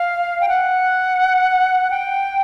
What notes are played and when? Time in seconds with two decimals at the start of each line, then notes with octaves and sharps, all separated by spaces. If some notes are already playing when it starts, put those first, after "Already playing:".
Already playing: F5
0.41 G5
0.48 F#5
1.90 G5